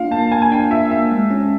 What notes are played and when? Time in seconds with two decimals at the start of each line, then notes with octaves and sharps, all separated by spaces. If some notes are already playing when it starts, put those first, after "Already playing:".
Already playing: A#3 D4 F4 F5
0.11 A#3 A5
0.31 A#3 G#5
0.42 G#5
0.52 D4 G5
0.70 F4 E5
0.91 A#3 E5
1.12 G#3
1.31 C#4